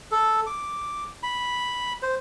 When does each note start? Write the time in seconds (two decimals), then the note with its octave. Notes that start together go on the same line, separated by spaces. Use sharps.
0.11 A4
0.47 D6
1.23 B5
2.03 C5